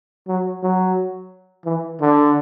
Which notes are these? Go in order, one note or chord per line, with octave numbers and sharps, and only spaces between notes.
F#3
F#3
E3
D3